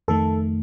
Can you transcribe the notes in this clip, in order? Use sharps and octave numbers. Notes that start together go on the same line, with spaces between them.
F2 D#3 A3 A4